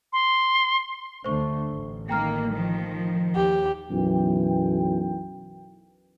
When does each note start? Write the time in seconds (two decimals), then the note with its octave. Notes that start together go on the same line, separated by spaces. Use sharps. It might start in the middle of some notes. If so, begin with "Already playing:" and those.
0.13 C6
1.24 D2 D3 A3 C5 C#6
1.70 A1
2.09 D#3 A#3 G5 A#5 F6
2.52 D#3 F3
3.35 D#2 G4
3.90 B1 F#2 E3 G5